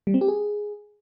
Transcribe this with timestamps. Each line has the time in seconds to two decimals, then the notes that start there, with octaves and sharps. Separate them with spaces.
0.07 G3
0.14 C4
0.21 G4
0.28 G#4